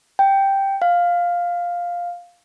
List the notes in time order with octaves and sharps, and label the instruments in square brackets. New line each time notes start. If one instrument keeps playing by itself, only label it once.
[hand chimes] G5
F5